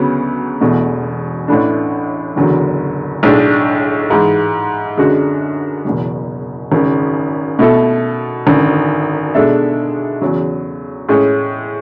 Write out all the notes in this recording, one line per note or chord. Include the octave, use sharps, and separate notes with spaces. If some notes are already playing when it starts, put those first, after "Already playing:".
Already playing: D2 C#3 F#3 B3
E1 E2 B2 A3
A1 A2 E3 A3 D4
F#1 E2 D3 F#3
B1 A2 G#3 D4
G#2 E3 G#3
F#2 D3 G#3 D4 F#4
F#1 E2 B2
G#1 F#2 C#3
B2 A3 E4 A4
G#1 F#2 D3
B2 G#3 D4 A4 E5
E2 C#3 F#3
A2 G#3 C#4 G#4